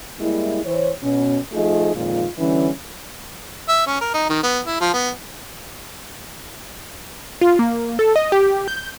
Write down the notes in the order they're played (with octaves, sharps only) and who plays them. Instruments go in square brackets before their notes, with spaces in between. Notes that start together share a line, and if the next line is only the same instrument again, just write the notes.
[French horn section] G3 G#3 A#3 E4
E3 C5 C#5
B2 C#4
F3 A3 D#4 F4 G#4 D#5
F2 A#2 D#3 G#3 F4
D3 E3 G3 C#4
[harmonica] E5
C#4
A#4
D#4
D#3
B3
E4
F3
B3
[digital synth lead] F4
A#3
A4
D#5
G4
G6